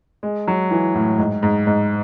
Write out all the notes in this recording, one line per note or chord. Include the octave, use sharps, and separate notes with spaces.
G#3
F#3
E3
A2
G#2
G#2
G#2